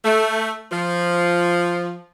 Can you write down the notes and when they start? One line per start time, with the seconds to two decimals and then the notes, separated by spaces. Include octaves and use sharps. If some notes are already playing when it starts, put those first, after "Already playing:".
0.04 A3
0.72 F3